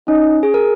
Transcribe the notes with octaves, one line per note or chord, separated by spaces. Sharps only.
C#4 D#4
G#4
A#4